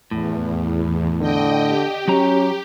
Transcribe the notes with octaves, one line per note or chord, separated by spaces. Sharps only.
E2 A2
D3 D#5 G5
G4
F#3 C#4 F#4 A#5